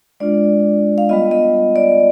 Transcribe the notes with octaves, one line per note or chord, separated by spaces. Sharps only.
G#3 D4 F4 D5
F5
G3 B3 F4 D#5
D#5
D5